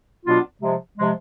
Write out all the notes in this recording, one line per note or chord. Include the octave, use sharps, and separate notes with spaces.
B2 F#3 B3 D4 F4
C3 F3 G#3
C3 F3 G#3